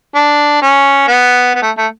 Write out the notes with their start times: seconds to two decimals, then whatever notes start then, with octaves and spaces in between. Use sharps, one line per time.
0.15 D4
0.62 C#4
1.08 B3
1.55 B3
1.62 A3
1.78 A3